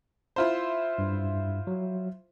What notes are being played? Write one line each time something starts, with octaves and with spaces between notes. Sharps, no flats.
E4 F4 C5
G2
F#3